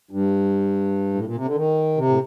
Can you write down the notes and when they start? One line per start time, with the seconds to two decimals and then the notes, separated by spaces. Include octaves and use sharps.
0.11 G2
1.14 A2
1.25 A#2
1.36 C3
1.45 D3
1.56 D#3
1.97 C3
2.09 A2